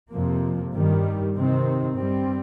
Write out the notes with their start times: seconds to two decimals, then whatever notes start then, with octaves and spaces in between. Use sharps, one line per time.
0.12 F2 C3 F3 A#3
0.74 G2 D#3 G3
1.36 C3 D#3 C4
1.97 G2 G3 C4